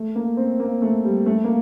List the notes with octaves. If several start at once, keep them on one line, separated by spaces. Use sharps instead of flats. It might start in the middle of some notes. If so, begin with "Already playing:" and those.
Already playing: A3
A#3
C4
A#3
A3
G3
A3
A#3